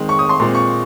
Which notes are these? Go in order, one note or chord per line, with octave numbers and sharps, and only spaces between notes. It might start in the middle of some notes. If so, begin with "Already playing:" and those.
Already playing: D#3 G#3 C4
C#6
D#6
C6
A#2 G#3 C4 C6
C#6